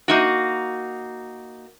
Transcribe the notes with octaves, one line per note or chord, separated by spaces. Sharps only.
A#3 D#4 F#4